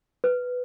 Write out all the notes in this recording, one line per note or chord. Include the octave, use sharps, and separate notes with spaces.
B4